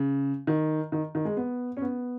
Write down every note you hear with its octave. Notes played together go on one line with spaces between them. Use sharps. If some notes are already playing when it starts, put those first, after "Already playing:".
Already playing: C#3
D#3
D#3
D#3
G#3
B3
C#4
B3